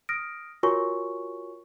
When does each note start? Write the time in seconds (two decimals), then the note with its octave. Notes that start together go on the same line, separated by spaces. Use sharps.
0.09 D#6 F6 A#6 D7
0.63 F4 F#4 A#4 C#5 G#5 C#6